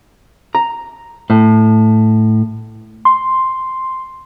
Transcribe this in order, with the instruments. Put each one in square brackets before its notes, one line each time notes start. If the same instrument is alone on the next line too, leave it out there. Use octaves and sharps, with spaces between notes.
[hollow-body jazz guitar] A#5
A2
[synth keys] C6